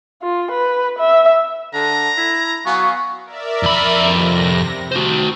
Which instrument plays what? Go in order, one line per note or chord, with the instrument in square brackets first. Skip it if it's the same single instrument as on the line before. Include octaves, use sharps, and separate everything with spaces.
[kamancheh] F4
B4
E5
[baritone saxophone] D3 [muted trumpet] A#5
[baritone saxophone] E4
[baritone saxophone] F#3 [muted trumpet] B3 [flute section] F5 G#5 C#6
[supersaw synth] A#4 D5 E5
[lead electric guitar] F2 B5
[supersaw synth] C3 A#6
[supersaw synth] C4 [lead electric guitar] F#4 C5